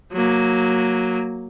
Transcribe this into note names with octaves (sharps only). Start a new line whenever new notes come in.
F#3 A#3